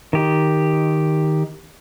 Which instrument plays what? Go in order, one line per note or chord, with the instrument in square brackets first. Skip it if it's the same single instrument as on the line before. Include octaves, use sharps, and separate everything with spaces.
[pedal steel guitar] D#3 G4